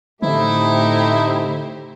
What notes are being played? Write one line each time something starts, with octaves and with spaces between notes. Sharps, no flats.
A2 D3 A3 C4 D#4 E4 G4 C5